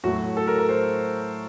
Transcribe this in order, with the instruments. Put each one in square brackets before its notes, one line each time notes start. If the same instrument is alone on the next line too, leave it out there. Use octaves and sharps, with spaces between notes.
[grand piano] A2 F#3 A3 F#4
A4
A#4
A#4
C5